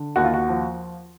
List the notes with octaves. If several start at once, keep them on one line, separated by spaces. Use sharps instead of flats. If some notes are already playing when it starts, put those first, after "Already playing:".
Already playing: D3
D#2 F#4
F4
F#4
F3